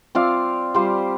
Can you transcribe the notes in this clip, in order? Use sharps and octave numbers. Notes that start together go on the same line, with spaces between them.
C4 F4 D5 F5
G3 F4 C5